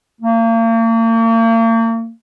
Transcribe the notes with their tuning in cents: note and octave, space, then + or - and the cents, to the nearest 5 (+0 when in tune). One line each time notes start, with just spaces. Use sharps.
A#3 -40